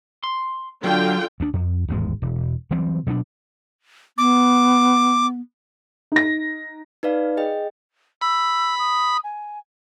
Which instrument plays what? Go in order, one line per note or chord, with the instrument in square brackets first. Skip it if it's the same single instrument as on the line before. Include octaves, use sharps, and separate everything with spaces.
[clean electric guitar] C6
[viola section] D3 F4 G5 [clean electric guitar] F#3
[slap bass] D2 D4
F2
D1 G#1 E2 G#3
E1
E3 F#3 G3 C4
B2 F#3 C#4 D4
[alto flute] B3 [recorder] D6
[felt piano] D#4 A#6
[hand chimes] D#4 B4 D5 F5
G#4 D#5 G5
[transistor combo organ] B5 [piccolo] E6
[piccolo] D#6
G#5